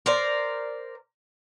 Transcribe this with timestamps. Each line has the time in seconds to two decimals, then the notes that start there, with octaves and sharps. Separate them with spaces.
0.06 A#4 C5 D5